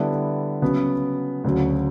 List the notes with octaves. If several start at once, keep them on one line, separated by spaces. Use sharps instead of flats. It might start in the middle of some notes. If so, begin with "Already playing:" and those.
Already playing: D3 G3 B3 E4
C#3 F#3 B3
D2 C#3 F#3